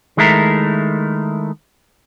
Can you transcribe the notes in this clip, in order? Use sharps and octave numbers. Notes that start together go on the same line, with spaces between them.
D#3 G#3 A3 E4 A#4